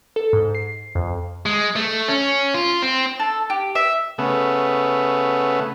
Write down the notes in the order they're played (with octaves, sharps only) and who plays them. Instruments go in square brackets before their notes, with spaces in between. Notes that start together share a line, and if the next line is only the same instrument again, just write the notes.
[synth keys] A4
G#2
C7
F2
[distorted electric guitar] G#3
A3
C#4
F4
C4
[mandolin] A4
G4
E5
[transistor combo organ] C#3 A3 B3